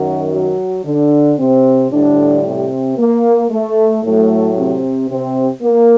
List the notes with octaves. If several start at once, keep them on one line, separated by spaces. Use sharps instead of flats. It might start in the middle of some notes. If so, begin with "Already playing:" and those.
Already playing: F#2 D#3 F#3 F#4
F#3 F#4
D3 D4
C3 C4
A2 D3 G3 D4
C3 C4
A#3
A3
A2 F#3 A3
C3 C4
C3 C4
A#3